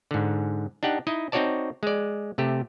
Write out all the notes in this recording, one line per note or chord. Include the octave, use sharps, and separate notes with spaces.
G#2 D3
D4 D#4 G4 F#5
D#4 E4 D#5
C4 D#4 F#4 C#5 D5 A5
G#3 D5
C3 A3 G4